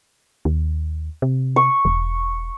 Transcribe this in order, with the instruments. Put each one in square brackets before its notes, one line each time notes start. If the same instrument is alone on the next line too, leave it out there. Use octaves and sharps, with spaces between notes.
[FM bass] D#2
C3
[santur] C#6
[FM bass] E1